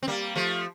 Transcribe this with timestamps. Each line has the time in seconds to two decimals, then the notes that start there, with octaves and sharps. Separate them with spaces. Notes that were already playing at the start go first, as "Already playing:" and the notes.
0.03 C4
0.08 G3 A#3
0.36 F3 A3